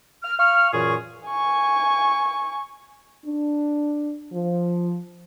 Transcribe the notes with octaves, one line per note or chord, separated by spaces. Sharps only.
F6
F5 C#6 F6
F#2 A#2 E3 G#4 C#6
G#5 C#6
D4
F3